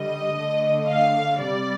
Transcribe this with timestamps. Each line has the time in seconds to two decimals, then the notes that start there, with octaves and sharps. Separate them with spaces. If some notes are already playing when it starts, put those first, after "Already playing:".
Already playing: D3 G3 D#5
0.35 D3 A3
0.88 F5
1.40 C3 G3 D5